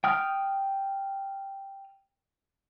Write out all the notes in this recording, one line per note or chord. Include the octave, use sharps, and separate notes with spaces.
G5 D#6 F6